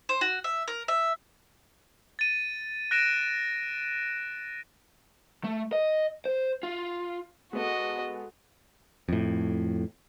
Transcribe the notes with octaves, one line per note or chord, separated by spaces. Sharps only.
C5
F#4
E5
A#4
E5
A6 D#7
F#6 A#6 D7 E7
A3
D#5
C5
F4
G#3 B3 F#4 A4 D#5
F2 A2